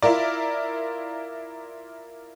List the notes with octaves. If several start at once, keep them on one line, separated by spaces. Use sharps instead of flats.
E4 F4 A#4 D5